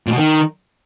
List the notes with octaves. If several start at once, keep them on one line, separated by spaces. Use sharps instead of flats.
A#2
B2
D#3